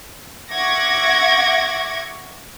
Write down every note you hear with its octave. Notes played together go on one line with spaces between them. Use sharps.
E5 F#5 C#6 D6 G#6 A#6